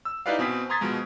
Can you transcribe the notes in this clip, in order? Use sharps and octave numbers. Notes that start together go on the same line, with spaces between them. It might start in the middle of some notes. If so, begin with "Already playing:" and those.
E6
D#4 E4 G4 B4 D5 F5
B2 C4 G#5 D#6 B6
A#5 C6 D#6 G#6 A6 B6
B2 F3 G#3